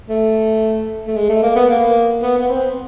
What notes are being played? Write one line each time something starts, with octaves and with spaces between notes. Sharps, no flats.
A3
A3
G#3
A3
A#3
B3
A#3
B3
B3
C4